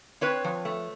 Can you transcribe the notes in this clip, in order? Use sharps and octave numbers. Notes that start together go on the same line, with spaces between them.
C4 B4 C#5
F3
A3